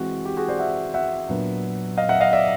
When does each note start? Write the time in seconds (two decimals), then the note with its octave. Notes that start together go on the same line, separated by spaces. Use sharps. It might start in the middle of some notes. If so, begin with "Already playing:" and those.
Already playing: E3 G#3 C4 F#4
0.25 G4
0.37 F#4 G#4
0.48 C5 D5
0.59 E5 F#5
0.94 E5 F#5
1.28 A#2 F#3 B3 D4
1.97 D#5 F5
2.09 E5 F#5
2.21 D#5 F5
2.33 D5 E5